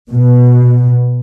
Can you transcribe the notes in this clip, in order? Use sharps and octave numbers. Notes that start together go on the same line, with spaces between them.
B2